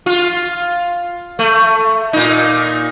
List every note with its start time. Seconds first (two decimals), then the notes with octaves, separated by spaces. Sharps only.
0.06 F4
1.39 A3
2.13 A#2 D#4